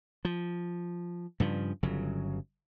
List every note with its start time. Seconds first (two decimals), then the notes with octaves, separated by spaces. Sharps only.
0.25 F3
1.40 G2 C#3 F3
1.83 G1 C#3 F#3